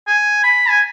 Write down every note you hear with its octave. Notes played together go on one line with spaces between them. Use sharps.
G#5
B5
G#5